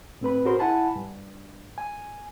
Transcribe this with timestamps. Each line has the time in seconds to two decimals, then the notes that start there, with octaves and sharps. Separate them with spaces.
0.21 A2 C4 B4 B5
0.45 F#4 G#4 A#4 C5 C6
0.59 E4 F#5 G#5 A5 B5
0.96 G2
1.78 G#5